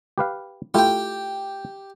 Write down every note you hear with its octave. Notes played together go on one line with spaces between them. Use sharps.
G4 B4 F5
A3 E4 F4 G4 G5